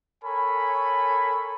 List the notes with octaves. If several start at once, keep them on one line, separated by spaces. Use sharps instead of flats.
A4 A#4 C#5 G#5 B5